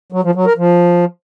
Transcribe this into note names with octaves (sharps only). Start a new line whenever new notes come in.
F#3
F3
F#3
A#4
F3